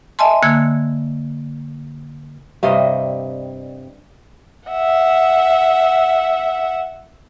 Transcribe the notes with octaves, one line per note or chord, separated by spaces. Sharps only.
D#5 E5 G#5 A5 C6
D3 A#3 E6 F#6 G#6
G2 C3 G3 D#5
E5 F#5